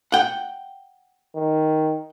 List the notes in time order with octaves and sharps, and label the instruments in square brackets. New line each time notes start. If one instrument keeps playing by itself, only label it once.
[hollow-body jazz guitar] F#5 G5
[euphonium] D#3